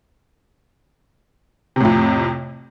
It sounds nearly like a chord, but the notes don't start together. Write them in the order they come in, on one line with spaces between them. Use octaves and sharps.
C3 A2 F2